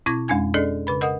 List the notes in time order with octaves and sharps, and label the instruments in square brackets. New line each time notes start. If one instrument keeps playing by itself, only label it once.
[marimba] B2 C4 E4 D6 G#6 A#6
F2 G#3 C#4 D4 G#5 G#6
C#4 D4 G#4 A4 D5 D#5
C#3 B4 B5
A#4 D#5 F#5 D#6